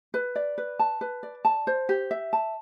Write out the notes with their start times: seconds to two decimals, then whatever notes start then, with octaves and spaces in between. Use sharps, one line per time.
0.14 B4
0.36 D5
0.58 B4
0.79 A5
1.01 B4
1.23 D5
1.45 A5
1.67 C5
1.89 G4
2.11 E5
2.33 A5